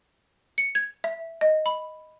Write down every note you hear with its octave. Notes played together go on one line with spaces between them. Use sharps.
C#7
G#6
E5
D#5
B5